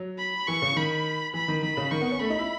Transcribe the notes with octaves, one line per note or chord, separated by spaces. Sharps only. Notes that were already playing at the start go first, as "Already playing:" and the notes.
Already playing: F#3
B5
E3 C#6
C#3
D#3 B5
E3 B5
D#3
D#3 B5
C#3
D#3 C#6
B3
C#4
A3 B5
D#4
E4